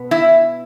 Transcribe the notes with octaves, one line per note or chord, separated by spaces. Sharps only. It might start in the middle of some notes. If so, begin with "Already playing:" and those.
Already playing: B2 B3
E4